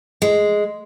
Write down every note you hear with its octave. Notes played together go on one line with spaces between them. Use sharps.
G#3